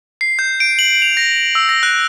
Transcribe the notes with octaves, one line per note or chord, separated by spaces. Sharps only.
C7
G6
D7
F#7
F7
A#6
E6
A#6
F#6